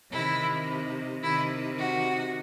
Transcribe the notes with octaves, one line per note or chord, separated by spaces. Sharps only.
C3 D#3 E4
C3 D#3 E4
F#4